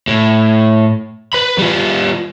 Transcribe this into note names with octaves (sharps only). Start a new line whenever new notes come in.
A2
B4 B5
G3 F4